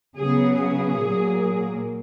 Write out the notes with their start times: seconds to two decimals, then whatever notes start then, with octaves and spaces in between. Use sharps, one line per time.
0.16 C#3 F#3 B3 G#4
0.56 G#4
0.97 A#2 F#3 A#3